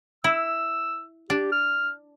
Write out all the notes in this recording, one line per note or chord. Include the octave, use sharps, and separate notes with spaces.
E4 E6
D4 G4
F6